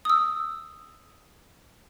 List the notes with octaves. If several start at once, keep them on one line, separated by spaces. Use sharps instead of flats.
D#6 E6